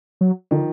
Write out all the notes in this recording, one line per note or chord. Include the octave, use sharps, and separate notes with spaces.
F#3
D3 D#3 F3